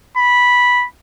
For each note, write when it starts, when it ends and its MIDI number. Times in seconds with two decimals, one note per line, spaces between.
0.17 0.86 83